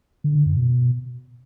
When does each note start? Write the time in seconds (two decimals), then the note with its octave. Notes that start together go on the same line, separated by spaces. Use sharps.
0.24 D3
0.35 D3
0.46 F#2
0.56 B2